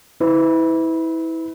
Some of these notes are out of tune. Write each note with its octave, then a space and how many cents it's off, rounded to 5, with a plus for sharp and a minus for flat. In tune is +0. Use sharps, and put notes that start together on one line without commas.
E4 -25 B4 +30